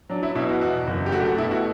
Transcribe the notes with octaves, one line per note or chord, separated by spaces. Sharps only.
F#3 D4
E4
B2 E4
F#4
E2 F#4
F#1
G4
A3 F#4
G4
F#4
B2 E4
F#4